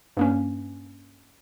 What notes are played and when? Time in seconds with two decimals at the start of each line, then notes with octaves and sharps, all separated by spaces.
0.17 G2 A#3 C#4